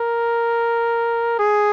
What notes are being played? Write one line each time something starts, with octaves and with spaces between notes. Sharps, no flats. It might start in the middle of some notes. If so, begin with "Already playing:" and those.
Already playing: A#4
G#4